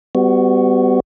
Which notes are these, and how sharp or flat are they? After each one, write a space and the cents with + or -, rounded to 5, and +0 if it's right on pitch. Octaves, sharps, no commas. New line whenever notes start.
G3 +10 B3 +35 F#4 +0